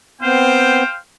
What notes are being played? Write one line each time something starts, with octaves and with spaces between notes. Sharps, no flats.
B3 C4 C5 F5 G5